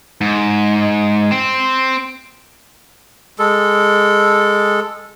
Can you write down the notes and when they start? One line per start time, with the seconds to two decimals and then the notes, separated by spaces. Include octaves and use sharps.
0.21 G#2
1.31 C4
3.39 G#3 A4